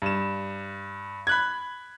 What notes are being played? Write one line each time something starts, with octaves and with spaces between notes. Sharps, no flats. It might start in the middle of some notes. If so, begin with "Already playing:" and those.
G2 E7
B5 F#6 G#6